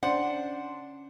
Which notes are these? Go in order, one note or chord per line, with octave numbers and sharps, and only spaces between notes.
C#4 D4 C5 F#5